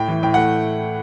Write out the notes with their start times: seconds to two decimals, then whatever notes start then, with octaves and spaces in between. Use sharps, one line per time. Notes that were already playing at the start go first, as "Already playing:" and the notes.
Already playing: A2 G5
0.08 E3
0.23 A2 G5
0.34 A3 F#5